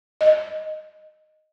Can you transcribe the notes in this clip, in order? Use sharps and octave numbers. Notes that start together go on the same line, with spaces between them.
D#5